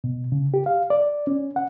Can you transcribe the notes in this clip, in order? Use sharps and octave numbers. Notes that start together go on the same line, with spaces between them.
B2
C#3
G4
F5
D5
C#4
F#5